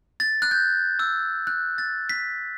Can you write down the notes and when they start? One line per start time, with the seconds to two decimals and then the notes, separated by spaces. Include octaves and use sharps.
0.20 A6
0.42 F#6
0.51 G6
0.99 E6
1.47 F#6
1.78 A6
2.09 B6